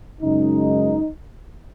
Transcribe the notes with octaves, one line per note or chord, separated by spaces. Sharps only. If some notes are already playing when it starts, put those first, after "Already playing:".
F#2 C#3 G#3 D#4